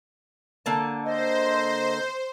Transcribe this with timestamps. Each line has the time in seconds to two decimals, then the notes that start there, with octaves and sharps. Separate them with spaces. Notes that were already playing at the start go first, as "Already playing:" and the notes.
0.66 D3 A#3 A5
1.05 C5 D#5